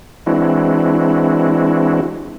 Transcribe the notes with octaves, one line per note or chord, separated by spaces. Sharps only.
E3 G#3 C4 D4 E4 F#4